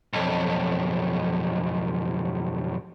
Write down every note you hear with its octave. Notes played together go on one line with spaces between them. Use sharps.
B1 F2